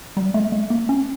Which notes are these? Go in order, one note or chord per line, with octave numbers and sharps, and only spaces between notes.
G3
A3
A3
A#3
C#4